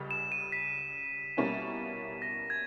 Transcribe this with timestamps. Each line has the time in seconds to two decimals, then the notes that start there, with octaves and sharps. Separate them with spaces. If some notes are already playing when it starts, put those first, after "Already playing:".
Already playing: C#2 C#3 G3
0.11 E7
0.32 D#7
0.52 B6
1.37 B2 G3 A#3 C#4 E4
2.22 A#6
2.50 G#6